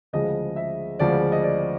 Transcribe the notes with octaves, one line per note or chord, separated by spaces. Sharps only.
D2 C#3 F3 G#3 D#5
E5
D2 C#3 F3 G#3 D5
D#5
D5